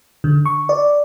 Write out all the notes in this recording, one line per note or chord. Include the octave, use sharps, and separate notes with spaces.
D3
C#6
D5